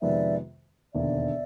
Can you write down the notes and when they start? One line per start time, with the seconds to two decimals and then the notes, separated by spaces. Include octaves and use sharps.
0.02 F2 C3 D#3 G#3 B3 D5 E5
0.94 E1 D#2 D3 D5 E5